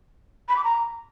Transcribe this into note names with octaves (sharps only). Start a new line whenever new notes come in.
B5
D6
A#5